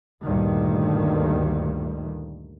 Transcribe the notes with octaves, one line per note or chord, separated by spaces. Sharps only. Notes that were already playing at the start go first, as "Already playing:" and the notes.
D2 G2 A#2 D#3